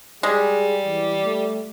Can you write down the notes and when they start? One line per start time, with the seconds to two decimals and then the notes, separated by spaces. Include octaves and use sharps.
0.23 G3 G#3 G#4
0.85 E3
1.25 A3